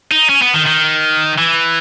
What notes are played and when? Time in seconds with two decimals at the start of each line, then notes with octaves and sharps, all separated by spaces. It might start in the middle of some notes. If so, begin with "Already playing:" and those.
0.11 D#4
0.29 C#4
0.42 B3
0.54 D#3
0.66 D#3
1.38 E3